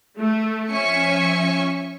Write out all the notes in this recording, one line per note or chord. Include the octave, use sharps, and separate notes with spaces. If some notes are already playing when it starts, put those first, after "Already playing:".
A3
F3 C#4 E5 G#5 C#6 C#7